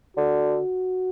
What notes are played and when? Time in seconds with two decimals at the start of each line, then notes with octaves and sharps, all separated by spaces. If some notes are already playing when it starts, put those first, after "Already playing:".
0.17 D3 F#4